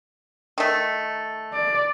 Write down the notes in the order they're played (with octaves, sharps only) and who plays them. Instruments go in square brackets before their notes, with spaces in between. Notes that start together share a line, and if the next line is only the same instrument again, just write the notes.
[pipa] D#3 A3
[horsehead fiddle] D5